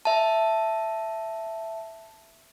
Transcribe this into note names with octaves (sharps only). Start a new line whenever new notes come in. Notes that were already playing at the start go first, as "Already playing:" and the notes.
E5 A5